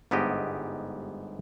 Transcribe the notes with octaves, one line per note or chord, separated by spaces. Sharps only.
G1 G#2 B3 E4 G4 D#5